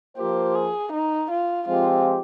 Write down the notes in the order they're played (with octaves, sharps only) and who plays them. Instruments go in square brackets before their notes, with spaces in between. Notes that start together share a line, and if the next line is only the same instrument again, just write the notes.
[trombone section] F3 A#3 F4 C5 [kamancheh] G4
[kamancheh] G#4
D#4
F4
[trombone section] F3 G#3 C4 G4 [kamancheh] F4